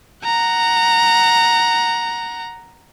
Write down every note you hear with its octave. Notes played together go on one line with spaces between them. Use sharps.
F#5 A#5